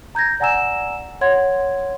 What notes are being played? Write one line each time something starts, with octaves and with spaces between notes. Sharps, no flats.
A#5 G6 G#6 A#6
D5 F#5 G#5 A#5 E6 E7
C#5 F#5 C6 G#6